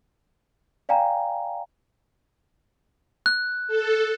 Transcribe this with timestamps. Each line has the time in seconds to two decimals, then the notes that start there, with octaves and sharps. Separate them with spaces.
0.89 D5 F5 G5 G#5 A#5
3.26 F#6
3.67 A4